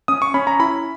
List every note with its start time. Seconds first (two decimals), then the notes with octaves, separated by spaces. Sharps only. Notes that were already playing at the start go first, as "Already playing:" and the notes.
0.08 C#4 D#6
0.22 C#6
0.34 C#4 B5
0.47 A#5
0.60 E4 B5